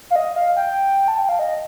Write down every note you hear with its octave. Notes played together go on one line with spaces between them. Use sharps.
F5
D#5
F5
G5
A5
G5
F5
D#5